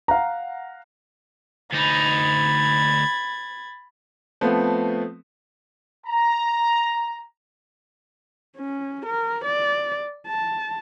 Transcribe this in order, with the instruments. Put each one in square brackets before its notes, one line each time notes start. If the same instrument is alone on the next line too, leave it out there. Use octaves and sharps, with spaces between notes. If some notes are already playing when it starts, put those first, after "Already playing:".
[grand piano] F5 F#5 A#5
[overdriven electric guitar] D2 D#4 [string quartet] B5 G#6 A6
[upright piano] F3 A3 B3 C4
[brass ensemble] A#5
[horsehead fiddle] C#4
A#4
D5
A5